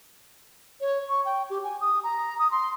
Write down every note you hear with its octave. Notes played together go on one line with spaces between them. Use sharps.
C#5
C#6
G5
G4
G#5
D#6
A#5
D#6
C6